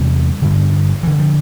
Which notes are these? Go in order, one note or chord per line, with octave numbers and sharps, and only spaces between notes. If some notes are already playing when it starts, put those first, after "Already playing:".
Already playing: E2 C3 G3
G2 D3
G2 D3 E3
F3